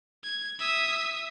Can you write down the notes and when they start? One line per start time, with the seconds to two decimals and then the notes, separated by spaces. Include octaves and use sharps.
0.24 G#6
0.59 E5 D#6